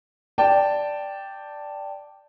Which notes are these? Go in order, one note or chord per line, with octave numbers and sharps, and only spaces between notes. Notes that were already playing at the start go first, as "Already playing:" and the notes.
D5 G5 A5